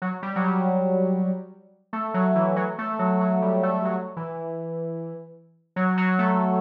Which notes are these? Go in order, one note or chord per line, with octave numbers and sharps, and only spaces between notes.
F#3
G3
F#3
G3
A3
F#3
E3
F#3
A3
F#3
F#3
G3
A3
F#3
E3
F#3
F#3
A3